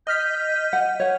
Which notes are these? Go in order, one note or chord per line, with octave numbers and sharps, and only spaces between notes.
D#5 F6 G6 B6
F#5
C#5 F#5